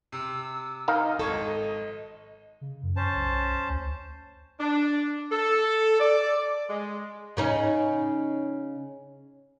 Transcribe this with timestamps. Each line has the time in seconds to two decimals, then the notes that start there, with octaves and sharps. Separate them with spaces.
0.12 C3 E6
0.88 D#4 A#4 D#5 F5
1.19 G#1 A4 C#6 G#6
2.61 C#3
2.83 F#2
2.96 C#4 C5 A5
3.15 B1
3.68 D2
4.59 D4
5.31 A4
6.00 D5
6.69 G#3
7.37 C#3 C#4 D#4